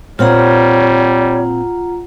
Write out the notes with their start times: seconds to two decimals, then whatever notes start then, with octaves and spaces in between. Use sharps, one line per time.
0.19 A#2 G3 C4 F4 C#5 F#5 A#5